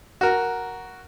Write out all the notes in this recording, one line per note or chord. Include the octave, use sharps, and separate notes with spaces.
F#4 A#4